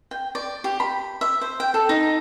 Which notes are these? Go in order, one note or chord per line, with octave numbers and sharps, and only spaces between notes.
G5
D5
G4
B5
E5
C5
G5
A4
D#4